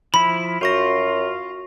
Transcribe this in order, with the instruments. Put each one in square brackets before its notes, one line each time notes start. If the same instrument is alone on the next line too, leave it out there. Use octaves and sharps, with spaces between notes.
[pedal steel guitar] F3 E4 [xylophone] B5
[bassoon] F#2 [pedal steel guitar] F4 [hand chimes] F#4 C#6 A#6